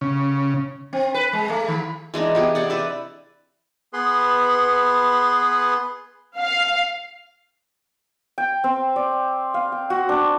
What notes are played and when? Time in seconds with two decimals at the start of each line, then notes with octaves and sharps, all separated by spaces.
0.01 C#3
0.93 C4
1.14 B4
1.33 G#3
1.50 A3
1.68 D#3
2.14 E3 G#3 D4 D#4
2.35 B3 G4 G#4
2.55 C3 D5 F#5
2.70 B4 D5 E5
3.93 B3 G#4 B4 C6
6.38 F5
8.38 G5
8.64 C4
8.96 D5
9.54 F5
9.72 G5
9.90 F#4
10.09 D4